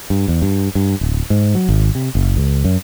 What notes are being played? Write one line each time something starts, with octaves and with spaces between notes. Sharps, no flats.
G2
E2
G2
G2
D1
G#2
F#3
G#1
C3
F#1
C#2
F#2